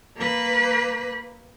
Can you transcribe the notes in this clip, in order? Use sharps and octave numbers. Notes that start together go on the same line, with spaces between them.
A#3 B4